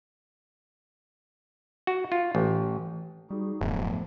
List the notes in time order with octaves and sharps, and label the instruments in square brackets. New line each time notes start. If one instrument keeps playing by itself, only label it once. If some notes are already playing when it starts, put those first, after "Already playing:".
[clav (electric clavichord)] F#4
F4
A1
[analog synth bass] G3 [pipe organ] D#4 F#4 G#4
[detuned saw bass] D1 [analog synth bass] F#2 [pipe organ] F3 A3 B3